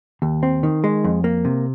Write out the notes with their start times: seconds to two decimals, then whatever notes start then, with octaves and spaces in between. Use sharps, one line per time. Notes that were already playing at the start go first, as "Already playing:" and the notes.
0.22 D#2
0.43 C4
0.63 D#3
0.84 G#3
1.04 F2
1.24 A#3
1.45 C3